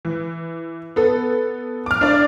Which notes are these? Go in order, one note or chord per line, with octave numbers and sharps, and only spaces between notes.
E3
B3 A4
D6 F6
D4 D5